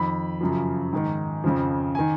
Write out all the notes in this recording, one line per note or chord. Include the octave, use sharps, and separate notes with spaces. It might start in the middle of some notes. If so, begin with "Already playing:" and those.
Already playing: F2 D#3 B5
F#2 C#3 F3
G#2 D#3
F2 C#3 F3
D#3 G#5